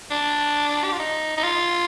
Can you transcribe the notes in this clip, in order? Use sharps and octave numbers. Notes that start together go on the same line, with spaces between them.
D4
G4
F4
D#4
D#4
F4